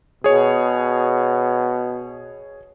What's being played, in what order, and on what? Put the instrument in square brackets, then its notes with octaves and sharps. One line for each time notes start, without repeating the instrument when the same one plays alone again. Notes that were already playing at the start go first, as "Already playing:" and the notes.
[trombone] B2 [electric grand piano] G#4 C#5